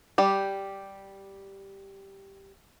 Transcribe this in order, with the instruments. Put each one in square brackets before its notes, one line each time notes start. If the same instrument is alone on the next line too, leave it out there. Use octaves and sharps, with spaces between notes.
[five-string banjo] G3 G4